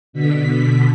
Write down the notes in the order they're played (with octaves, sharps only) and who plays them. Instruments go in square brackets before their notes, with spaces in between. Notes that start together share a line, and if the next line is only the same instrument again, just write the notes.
[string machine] B2 D3 B6